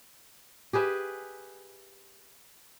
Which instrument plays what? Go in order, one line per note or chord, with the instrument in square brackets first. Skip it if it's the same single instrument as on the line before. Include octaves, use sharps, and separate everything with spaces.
[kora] G4 G#4 B4 E5